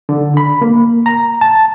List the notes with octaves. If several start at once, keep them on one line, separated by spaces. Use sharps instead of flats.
D3
B5
A#3
A#5
A5